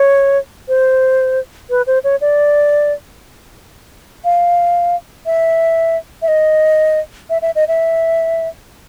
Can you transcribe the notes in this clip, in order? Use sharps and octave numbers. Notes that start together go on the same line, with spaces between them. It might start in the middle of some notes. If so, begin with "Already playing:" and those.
Already playing: C#5
C5
B4
C5
C#5
D5
F5
E5
E5
D#5
E5
E5
D#5
E5